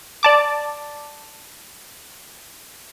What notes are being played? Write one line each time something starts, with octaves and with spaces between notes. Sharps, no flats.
D5 A5 D6